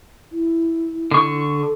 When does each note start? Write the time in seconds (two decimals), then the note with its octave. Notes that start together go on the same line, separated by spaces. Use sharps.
0.32 E4
1.11 D3 C#6
1.58 A4